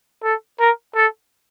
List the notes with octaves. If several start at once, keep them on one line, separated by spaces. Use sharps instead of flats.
A4
A#4
A4